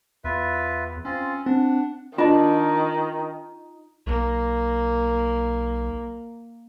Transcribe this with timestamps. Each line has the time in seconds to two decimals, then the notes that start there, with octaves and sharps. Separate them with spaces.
0.24 E2 F4 B4 E5
1.05 C4 C#4 F4
1.46 C4 D4 F#5
2.18 D#3 D4 F4 D#5
4.06 B1 A#3